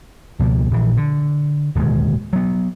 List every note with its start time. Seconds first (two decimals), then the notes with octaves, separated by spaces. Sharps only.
0.39 C#2 B2 F3 A#3
0.71 A#1 E3
0.97 D3
1.75 D1 D#2 B2 G#3
2.33 F#3 B3